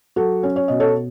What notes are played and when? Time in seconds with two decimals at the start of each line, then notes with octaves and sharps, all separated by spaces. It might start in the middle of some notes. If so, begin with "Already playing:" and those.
0.16 F#3 F#4 A4
0.43 C#4
0.56 C#5
0.68 B2 D#5
0.80 A4 C#5